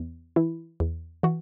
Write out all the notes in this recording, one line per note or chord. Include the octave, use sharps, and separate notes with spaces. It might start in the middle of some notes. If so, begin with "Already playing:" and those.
Already playing: E2
E3 E4
E2
E3 F#4